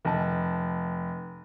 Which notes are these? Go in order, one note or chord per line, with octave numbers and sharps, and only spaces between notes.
F1 A5